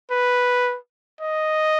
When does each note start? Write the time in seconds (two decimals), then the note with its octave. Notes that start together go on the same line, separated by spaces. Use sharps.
0.11 B4
1.21 D#5